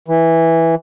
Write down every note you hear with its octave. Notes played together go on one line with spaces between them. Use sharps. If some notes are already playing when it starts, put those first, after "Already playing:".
E3